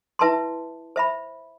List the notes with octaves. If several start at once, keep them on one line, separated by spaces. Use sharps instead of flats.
E4 B4 E5 A5 C6
C5 E5 B5